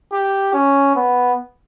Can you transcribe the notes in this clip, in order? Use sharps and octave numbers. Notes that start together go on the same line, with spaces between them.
G4
C#4
B3